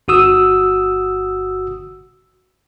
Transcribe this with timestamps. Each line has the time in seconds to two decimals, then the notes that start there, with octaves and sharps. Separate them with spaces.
0.08 G1 F#4 D#6 E6